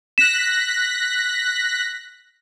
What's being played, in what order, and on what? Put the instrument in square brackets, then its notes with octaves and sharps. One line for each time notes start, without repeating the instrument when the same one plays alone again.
[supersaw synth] F#6 A#6 B6 [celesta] E7